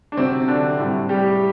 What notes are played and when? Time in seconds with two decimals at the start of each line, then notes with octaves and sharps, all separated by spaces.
0.12 D4
0.17 C3 F#3 C4
0.48 D3 D4
0.78 A2 G3
1.09 G3 G4